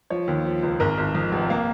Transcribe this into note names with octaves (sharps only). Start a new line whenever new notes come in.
F3 C#5
D#2
F3
C#2
G#1 A#4
G#1
F2
F1
A#3